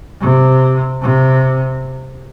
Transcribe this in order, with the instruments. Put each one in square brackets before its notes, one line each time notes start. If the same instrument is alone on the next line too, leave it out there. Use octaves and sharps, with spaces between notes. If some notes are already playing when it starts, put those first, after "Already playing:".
[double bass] C3
C3